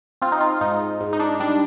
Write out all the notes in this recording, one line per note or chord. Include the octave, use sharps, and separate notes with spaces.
C4 F4
D#4
F4
G#2 D#4
G#2
D#4
D4
G3 D4